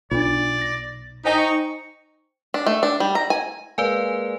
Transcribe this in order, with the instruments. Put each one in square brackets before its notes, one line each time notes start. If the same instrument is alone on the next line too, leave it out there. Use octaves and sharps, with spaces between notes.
[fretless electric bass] B1 [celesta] D4 F4 [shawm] D5
[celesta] A6 A#6
[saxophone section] D#4 [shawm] G4 [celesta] C5 G5 G#5
[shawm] C#6
[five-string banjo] D4
A3
D4
G3
A#5
G#5
[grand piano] G#3 A#3 F5 [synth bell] B4 D5 G#5